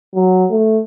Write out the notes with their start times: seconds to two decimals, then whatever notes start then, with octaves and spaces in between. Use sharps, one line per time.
0.15 F#3
0.51 A3